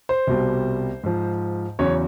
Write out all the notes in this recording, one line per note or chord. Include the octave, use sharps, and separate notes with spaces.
C5
C2 B2 G3
G#2 F3
E2 C#3 F#3 C#5